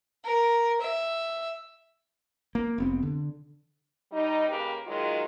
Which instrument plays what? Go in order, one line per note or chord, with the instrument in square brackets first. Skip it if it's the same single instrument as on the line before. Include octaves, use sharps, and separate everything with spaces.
[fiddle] A#4
E5
[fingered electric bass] A#3
F1 B3 C4
D3
[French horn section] G3 D#4
C#3 A#3 G4 B4
D#3 F#3 G#3 F4